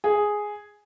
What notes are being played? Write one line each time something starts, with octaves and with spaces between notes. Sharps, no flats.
G#4